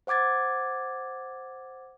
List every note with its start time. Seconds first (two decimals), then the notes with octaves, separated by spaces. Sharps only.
0.07 C5 F#5 D6 G#6 A6